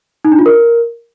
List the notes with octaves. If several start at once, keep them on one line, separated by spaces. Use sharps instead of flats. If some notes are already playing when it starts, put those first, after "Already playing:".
D#4
D4
F4
A#4